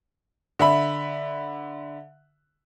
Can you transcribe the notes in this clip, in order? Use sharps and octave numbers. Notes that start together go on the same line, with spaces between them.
D3 E5 B5